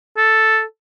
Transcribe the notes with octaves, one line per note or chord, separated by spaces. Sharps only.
A4